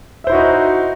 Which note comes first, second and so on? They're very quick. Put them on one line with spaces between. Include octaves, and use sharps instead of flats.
E5 C5 E4 F#4 D#4